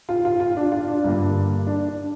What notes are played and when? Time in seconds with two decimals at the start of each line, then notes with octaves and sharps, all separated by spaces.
0.09 F4
0.25 F4
0.40 F4
0.57 D4
0.72 F4
0.88 D4
1.04 G2 D3 A#3
1.67 D4
1.88 D4